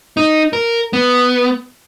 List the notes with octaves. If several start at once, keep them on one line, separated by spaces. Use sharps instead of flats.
D#4
A#4
B3